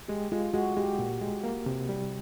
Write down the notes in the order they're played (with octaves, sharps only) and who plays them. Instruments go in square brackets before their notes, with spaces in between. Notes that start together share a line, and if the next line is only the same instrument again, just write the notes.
[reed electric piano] G#3 [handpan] G4
[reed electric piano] G#3 [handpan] F4
[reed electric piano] G#3 [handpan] F#4
[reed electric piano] G#3 [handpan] G4
[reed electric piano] A#2
G#3
A#3
C3
G3